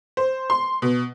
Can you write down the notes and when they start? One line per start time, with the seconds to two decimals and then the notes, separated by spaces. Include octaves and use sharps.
0.17 C5
0.50 C6
0.82 B2